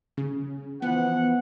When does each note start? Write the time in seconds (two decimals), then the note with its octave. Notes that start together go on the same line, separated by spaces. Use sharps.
0.17 C#3
0.82 E3 F3 B3 F#5